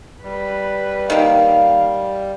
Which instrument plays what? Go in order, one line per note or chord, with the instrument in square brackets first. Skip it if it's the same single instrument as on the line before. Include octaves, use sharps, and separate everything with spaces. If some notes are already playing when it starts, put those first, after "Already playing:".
[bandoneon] G3 [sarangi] B4
[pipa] D#3 A#3 [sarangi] F5